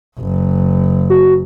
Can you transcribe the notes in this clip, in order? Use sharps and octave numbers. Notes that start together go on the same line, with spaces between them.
F#1
F#4